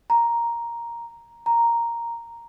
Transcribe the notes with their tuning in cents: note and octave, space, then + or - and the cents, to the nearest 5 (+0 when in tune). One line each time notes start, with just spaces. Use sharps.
A#5 +5
A#5 +0